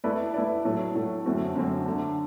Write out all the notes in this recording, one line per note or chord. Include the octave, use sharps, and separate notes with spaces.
A3 E4 B4 D5
A3 E4 B4 D5
A2 F#3 A3
A2 F#3 A3
F#2 D3 A3 C4 F#4
F#2 D3 A3 C4 F#4
D3 A3 D4